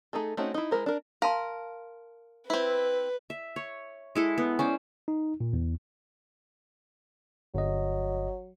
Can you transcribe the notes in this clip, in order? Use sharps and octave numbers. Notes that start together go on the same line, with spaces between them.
A3 D#4 G#4 A4
A3 C4 C#4 D#4 F#4
D#4 E4
G#3 E4 A#4 C5
D4 A#4
A#4 F5 A5 C6
C4 E4 B4
E5
C#5
G#3 E4 A4
B3
C#4 C5 D5
D#4
A#2
E2
G1 F#3 D#5